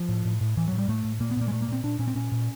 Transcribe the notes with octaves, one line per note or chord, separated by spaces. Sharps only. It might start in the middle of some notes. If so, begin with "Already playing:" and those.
Already playing: F3
A2
A2
A2
A2 E3
F#3
A2
G3
A2 A3
A2
A#2 A#3
B3
A#2 A#3
G#3
A#2 A3
A#3
A#2 C4
A#2 D4
A#2 C#4
C4
A#2 C#4
A#2